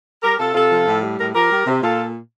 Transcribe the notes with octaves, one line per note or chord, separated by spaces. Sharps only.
G3 G4 A#4
C3 F4 A4
C3 F4 A4
F3
A2
G3
A2 A#4
F3 G4 A#4
G3
C3
A#2 F4 A4